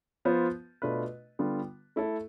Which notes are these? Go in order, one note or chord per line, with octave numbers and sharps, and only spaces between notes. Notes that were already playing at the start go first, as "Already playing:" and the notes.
F3 B3 F4 C5
B2 A3 D4 F4 B4
D3 G3 B3 F4
A3 E4 A4